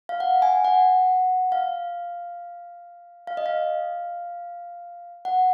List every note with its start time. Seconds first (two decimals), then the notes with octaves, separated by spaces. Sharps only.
0.09 F5
0.20 F#5
0.42 G#5
0.64 F#5
1.52 F5
3.27 F5
3.37 D#5
3.46 F5
5.25 F#5